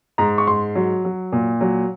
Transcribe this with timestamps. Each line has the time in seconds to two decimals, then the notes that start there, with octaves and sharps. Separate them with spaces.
0.18 G#2 A#5
0.38 C#6
0.47 G#2 C6
0.75 F#3
1.05 F#3
1.32 A#2
1.61 F#3